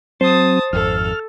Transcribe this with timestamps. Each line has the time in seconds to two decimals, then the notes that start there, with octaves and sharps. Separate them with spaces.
0.21 F#3 C4 C5 A5 D#6
0.73 G#1 F2 A4 F6